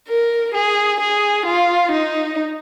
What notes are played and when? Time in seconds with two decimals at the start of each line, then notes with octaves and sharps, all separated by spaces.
0.09 A#4
0.54 G#4
1.00 G#4
1.46 F4
1.92 D#4